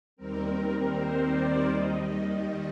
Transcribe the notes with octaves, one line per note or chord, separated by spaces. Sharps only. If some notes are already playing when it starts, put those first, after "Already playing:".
D#2 D#3 G3 C4 A#4
C5
D5
D#2 D#3 G3 D#5